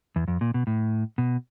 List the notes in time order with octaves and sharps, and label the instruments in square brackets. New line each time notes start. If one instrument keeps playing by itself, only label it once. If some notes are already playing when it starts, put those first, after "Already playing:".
[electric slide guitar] E2
F2
A#2
B2
A2
B2